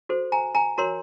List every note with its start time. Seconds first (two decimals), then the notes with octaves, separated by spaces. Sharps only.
0.09 F#4 A4 C5
0.32 G#5 A#5
0.55 G#5 A#5
0.78 F#4 A#4 C#5 A#5 C6